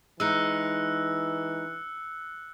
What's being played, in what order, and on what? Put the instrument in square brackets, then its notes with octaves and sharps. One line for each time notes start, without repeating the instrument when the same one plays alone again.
[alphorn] E3 [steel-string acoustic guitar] G#3 D#4 [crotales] E6 F#6 C#7